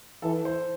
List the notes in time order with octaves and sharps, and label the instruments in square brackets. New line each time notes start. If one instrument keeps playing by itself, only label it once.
[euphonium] E3 [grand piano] A4
[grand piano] C5